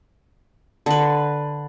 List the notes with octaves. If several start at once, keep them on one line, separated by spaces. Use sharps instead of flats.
D3 B4